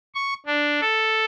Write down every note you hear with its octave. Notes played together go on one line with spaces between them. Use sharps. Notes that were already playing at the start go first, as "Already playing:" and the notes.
C#6
D4
A4